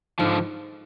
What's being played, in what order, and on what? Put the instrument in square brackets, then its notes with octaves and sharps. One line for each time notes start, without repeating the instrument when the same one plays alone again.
[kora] G#2 [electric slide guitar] D3 F3